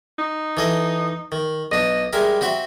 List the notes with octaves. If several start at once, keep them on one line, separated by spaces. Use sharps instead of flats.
D#4
E3 A4 D#5
D#3
B1 D4 D#5
G3 G#3 A#4 E5
C4 F#4 E5